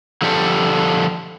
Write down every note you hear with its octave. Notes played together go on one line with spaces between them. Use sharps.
D3 F3 G3 G4 A4